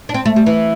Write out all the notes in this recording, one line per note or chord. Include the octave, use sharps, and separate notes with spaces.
D4
C4
A3
G3
E3